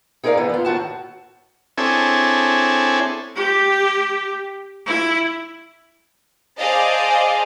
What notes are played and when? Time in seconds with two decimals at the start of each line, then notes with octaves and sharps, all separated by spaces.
0.24 D#4 G#4 A#4 B4 D5 F5
0.37 D3 E3 B3
0.49 B3 F4
0.65 A2 D#3 F#4 A5
1.78 C4 D4 E4 G#4 A4 C#5
3.36 G4
4.86 E4
6.58 G#4 C5 D5 D#5 F5 A5